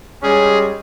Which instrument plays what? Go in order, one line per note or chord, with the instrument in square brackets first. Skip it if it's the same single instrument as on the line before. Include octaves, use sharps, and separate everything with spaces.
[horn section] G3 G#3 C#4 [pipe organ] G#4